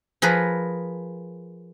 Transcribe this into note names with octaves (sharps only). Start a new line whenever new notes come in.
F3 G#4 A#4 B4